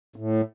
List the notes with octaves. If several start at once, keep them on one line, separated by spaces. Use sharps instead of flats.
A2